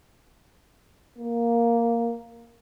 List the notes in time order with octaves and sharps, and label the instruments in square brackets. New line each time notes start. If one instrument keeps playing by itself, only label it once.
[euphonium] A#3